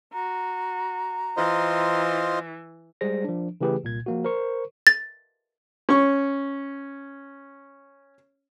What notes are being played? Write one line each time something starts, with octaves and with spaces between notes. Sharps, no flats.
F#4 A#5
E3 F4 C5 D#5
G3 G#3 G#4 C5 A#6
F3 D4
C#3 E3 A3 G4 G#4 B4
C2 A#2 G#6
F3 A#3 F#4
A#4 C5 C#6
A6
C#4 C#6